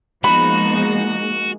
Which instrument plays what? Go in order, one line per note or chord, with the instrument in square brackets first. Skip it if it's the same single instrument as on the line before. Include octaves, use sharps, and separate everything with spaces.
[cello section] F3 B3 D#4 [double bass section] G#3 A#3 [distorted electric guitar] F#4 [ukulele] B5